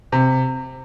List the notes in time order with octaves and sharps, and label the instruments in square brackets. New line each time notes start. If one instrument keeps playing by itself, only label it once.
[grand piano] C3